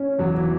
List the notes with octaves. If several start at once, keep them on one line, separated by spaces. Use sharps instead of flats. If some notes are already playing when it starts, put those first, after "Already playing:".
Already playing: C#4
E2 F#3
E3